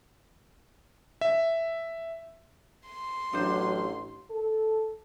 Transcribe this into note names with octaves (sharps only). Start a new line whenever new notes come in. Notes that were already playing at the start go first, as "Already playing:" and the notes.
E5
C6
A1 F#3 D4 C5
A4